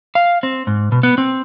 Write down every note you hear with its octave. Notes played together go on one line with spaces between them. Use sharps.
F5
C4
G#2
B2
B3
C4